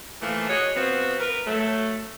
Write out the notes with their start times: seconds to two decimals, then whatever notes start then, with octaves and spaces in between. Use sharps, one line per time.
0.22 E3 F3 A3 A#3
0.49 F#4 G#4 C#5 D#5
0.76 F3 B3 C4 F#4
1.20 A#4 B4
1.47 F#3 A3